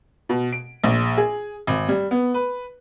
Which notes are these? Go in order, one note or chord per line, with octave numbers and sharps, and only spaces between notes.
B2
D7
A#1
G#4
G#1
G3
B3
B4